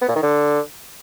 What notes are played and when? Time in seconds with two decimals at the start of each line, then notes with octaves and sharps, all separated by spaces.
0.01 B3
0.09 A#2
0.16 D#3
0.23 D3